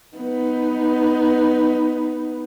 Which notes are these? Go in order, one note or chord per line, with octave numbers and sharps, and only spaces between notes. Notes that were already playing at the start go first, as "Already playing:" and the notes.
B3 D#4